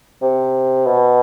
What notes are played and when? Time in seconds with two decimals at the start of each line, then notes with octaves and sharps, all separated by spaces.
0.22 C3
0.86 B2